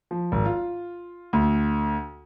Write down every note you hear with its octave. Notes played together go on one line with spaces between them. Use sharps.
F3
G#1
F4
D2